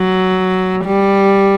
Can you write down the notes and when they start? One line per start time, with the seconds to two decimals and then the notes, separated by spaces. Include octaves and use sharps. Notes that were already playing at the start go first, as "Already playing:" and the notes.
Already playing: F#3
0.85 G3